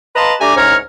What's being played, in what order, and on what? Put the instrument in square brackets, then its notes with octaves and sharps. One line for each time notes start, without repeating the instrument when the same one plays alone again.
[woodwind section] B4 D#5 F5 A5 A#5 C6
A3 D4 G4 G#5 A#5 D6
C2 G#2 C#4 C#5 A#5 F6